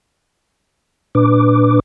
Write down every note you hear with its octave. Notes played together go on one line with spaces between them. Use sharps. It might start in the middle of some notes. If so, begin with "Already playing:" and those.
A#2 D4 B4 D6